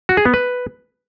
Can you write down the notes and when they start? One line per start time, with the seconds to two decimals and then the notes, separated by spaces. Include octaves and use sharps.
0.09 F#4
0.17 G#4
0.25 B3
0.34 B4